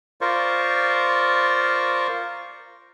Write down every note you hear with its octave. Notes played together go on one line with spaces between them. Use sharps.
F4 A#4 C5 D5 C#6